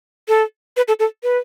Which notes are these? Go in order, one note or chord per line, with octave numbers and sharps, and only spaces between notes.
A4
B4
A4
A4
B4